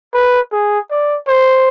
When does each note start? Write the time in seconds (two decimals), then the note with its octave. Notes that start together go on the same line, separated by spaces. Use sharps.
0.14 B4
0.52 G#4
0.90 D5
1.28 C5